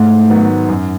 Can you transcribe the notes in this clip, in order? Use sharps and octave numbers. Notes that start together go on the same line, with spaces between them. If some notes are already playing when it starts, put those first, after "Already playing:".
Already playing: G#2 A3
D#3 F#3 B3
F#2